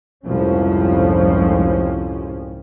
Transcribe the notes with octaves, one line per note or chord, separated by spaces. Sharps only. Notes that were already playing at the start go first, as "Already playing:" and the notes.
F1 C2 F2 G#2 F3 C#4